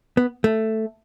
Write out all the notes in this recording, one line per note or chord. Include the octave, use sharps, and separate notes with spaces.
B3
A3